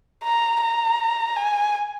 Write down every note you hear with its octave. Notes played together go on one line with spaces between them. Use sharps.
A#5
A#5
G#5